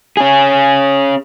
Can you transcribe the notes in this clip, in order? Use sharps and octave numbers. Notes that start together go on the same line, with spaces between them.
C#4 G#4